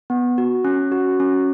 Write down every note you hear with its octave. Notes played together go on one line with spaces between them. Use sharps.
B3
F#4
C#4
F#4
C#4